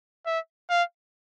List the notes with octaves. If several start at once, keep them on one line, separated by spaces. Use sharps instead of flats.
E5
F5